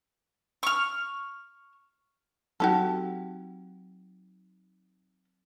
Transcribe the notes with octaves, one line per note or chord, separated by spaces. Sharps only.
C#6 F6
F#3 C4 D#4 F#4 G4 A4